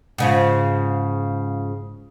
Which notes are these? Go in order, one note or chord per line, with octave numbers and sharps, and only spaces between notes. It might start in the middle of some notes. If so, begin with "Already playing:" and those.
G#2 C#3 F3